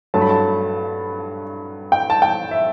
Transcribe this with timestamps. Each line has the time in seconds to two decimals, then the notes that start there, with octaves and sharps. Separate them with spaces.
0.14 G2 F#3 A3 A5
0.22 B5
0.29 A5
1.92 G5
2.10 A5
2.22 G5
2.51 E5